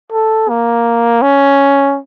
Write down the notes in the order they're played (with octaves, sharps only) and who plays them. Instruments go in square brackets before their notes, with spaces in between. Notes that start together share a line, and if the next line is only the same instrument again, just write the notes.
[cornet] A4
A#3
C#4